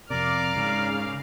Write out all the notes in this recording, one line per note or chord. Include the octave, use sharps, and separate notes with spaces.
F2 C3 A#4 D5 F5 D6 F6
G#2 C#3